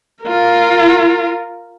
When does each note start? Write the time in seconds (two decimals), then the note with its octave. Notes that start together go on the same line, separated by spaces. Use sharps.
0.24 F4 A#4